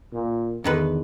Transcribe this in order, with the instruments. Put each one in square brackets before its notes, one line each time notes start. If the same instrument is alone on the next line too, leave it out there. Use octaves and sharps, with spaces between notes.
[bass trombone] A#2
[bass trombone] E2 [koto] D3 D#3 B4